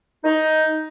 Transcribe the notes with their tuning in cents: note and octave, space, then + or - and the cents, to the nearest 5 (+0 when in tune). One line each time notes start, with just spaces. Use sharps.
D#4 +10